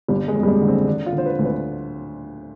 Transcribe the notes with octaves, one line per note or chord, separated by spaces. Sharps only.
G1 G3
G#3
F2
G3
G#3
D3
C4
D3 D4
F4
D3
C5
B4
D2
B4